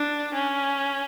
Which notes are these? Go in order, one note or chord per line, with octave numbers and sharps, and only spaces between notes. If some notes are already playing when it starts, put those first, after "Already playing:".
Already playing: D4
C#4